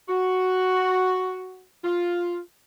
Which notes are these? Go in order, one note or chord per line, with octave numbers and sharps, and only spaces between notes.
F#4
F4